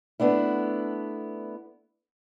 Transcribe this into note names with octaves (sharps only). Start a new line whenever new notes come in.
A3 B3 D4 E4